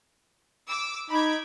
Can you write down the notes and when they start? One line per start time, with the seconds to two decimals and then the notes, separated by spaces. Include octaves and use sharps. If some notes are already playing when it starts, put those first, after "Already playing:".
0.66 D6 E6
1.10 D#4 B5 D6 G#6